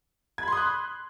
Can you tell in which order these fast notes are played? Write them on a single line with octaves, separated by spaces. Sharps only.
G#6 B5 C6 D#6 F#6